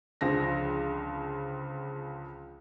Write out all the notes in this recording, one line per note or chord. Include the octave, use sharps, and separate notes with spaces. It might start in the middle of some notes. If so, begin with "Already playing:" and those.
C#2 D3 F3 A#6